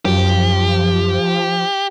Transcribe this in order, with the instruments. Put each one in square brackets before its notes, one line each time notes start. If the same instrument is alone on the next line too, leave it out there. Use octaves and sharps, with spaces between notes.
[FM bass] F#2 [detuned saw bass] F3 [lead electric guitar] G4